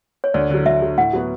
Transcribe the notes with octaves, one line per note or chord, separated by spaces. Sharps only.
C#5
D2 D5
D3 F#3
D2 E5
D3 F#3
A2 F#5
F#3 B3 F#4